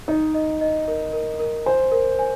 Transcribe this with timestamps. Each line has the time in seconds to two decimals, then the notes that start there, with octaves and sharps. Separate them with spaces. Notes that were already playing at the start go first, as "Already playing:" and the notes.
0.08 D#4 D#5
0.34 D#5
0.61 D#5
0.88 A#4
1.13 A#4
1.40 A#4
1.66 C5 G#5
1.92 A#4
2.19 G#5